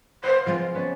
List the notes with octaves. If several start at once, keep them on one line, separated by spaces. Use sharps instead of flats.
B4 C5 F5 F#5
F3 G#3 C4 F4
B3 C#4 D5